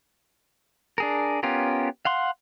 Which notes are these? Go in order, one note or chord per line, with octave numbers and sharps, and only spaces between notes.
D4 G#4 A#4
B3 C#4 F4 G4 A#4
F5 F#5 C6